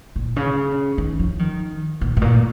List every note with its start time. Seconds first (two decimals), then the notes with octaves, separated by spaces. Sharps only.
0.16 A#2
0.36 C#3
0.98 D#3
1.19 F3
1.39 D#3
2.01 A#2
2.17 G#2
2.21 A#2